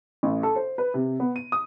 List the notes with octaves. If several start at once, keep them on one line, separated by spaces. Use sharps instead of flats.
A1
A4
C5
B4
C3
B3
D#7
D#6